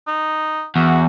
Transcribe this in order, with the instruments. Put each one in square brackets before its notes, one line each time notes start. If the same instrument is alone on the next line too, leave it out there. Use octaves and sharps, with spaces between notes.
[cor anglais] D#4
[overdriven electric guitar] E2 [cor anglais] F#4